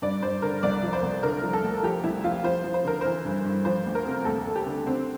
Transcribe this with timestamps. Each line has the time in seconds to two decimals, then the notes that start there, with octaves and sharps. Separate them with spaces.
0.02 G2 D5
0.22 G2 C5
0.42 D3 A#4
0.63 C2 D5
0.83 F3
0.93 C5
1.02 C2
1.23 D3 A#4
1.43 F3
1.53 A4
1.63 D2
1.83 F3 G4
2.04 C2 E4
2.24 F3 F4
2.44 F3 C5
2.64 F3
2.74 C5
2.84 D3 A#4
3.01 E3 C5
3.25 G2
3.45 G2
3.65 F3 C5
3.85 D2
3.95 A#4
4.06 C3
4.25 D2 A4
4.45 D2
4.56 G4
4.66 D3
4.86 D3 C4